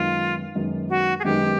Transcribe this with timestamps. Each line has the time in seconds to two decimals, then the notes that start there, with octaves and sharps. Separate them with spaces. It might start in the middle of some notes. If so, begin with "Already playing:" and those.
Already playing: F#2 D#3 G#3 B3 D#4 F4
0.55 F#2 D#3 G#3 B3 D#4
0.90 F#4
1.19 G#4
1.24 F#2 D#3 G#3 B3 D#4 G4